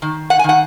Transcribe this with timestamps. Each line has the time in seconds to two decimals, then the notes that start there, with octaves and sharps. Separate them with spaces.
0.02 D#3
0.30 F#5
0.39 G#5
0.44 D#3 F#5